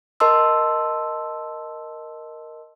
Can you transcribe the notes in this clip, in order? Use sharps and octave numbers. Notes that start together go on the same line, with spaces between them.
A#4 D#5 A5 C6 E6